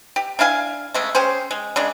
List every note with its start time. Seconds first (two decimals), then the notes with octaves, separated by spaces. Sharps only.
0.16 G4
0.39 D4 E4 F5 G#5
0.94 C#3 G#3 A3
1.15 C#4 G4 G#4 C5
1.51 G#3
1.76 C#3 G#3 D4